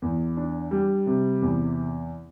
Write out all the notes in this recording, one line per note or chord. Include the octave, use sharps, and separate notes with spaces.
E2
D4
G3
C3
E2